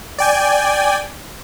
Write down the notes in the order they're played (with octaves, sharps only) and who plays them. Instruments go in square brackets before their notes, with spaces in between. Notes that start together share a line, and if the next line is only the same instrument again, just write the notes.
[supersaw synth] D5 G5 G#5